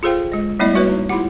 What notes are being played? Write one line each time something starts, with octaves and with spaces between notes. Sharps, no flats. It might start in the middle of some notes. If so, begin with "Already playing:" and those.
F4 G#4 A4 C5 F5 G5
G#3 D#5
G3 A3 B3 E4 D5 D#5
G3 A#3 F#4 B4 C#5
D#4
E4 F4 G4 F#5